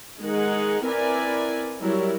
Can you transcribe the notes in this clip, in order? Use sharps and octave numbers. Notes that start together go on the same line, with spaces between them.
D#3 G#3 D#4 G#4 F#5
C4 E4 A#4 B4 D5 G#5
F#3 G3 E4 A#4